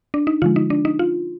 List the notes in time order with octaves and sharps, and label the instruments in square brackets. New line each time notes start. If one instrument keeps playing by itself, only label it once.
[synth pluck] D4
D#4
D3 F3 G#3 F4
D#4
D4
D#4
F4